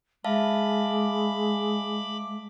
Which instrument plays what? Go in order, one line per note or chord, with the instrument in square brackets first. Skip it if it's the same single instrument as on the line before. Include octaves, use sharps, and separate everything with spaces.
[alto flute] G#3 [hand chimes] E5 F5 A5 [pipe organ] B5 D6